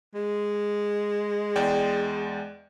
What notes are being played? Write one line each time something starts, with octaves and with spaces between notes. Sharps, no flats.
G#3
E2 D5 G5